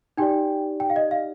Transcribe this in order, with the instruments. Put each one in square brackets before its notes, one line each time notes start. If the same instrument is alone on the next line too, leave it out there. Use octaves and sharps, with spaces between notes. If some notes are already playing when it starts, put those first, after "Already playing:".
[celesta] D#4 G4 D5 G5
G5
F5
D#5
F5